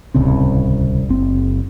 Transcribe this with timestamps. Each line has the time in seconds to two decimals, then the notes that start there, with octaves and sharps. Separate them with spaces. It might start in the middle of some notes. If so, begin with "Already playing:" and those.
0.14 D1 C2 C#3 C4
1.09 F#1 C4